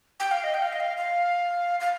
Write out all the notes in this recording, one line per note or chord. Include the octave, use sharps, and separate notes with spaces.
G5
F5
D#5
G5
F5
D#5
F5
F5
F5